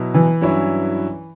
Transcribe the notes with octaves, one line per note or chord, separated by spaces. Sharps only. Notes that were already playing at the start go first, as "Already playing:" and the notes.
Already playing: B2 F#3 E4
E3
G2 F#3 C#4 E4